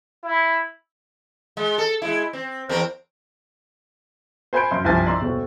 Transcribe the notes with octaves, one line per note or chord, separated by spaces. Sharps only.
E4
G#3
A4
G#3 E4
C4
E2 C4 A#4
C5 G#5 B5 G6 D7
F#2 C6
C2 G2 F3 C5 G#5 A6
D5 A#5 C6 E6
D#1 B2